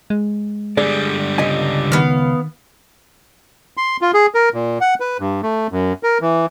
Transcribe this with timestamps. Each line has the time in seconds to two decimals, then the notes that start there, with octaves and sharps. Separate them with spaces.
0.10 G#3
0.77 D3 G3 G#4 D5
1.38 C#2 D#5 G#5
1.92 D#3 B3 F5
3.77 C6
4.01 F4
4.14 G#4
4.35 A#4
4.54 A#2
4.81 F#5
5.00 B4
5.20 G2
5.43 A3
5.72 F#2
6.03 A#4
6.21 E3